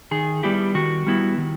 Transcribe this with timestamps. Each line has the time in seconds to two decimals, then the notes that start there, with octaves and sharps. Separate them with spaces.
0.11 D#3 G#4
0.43 G3 B3 E4 G4
0.75 D#3 F#4
1.07 G3 B3 E4
1.38 D#3